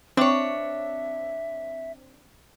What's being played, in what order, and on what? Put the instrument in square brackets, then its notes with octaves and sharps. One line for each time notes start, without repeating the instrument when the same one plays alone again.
[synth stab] C4 [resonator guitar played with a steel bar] D4 C#5 [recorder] E5